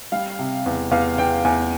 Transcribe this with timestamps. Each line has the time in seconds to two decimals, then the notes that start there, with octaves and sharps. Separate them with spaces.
0.12 G3 F5
0.39 C3
0.66 E2
0.91 E2 F5
1.18 E2 G5
1.44 E2 G#5